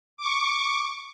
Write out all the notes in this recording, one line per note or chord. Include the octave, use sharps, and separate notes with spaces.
C#6 D6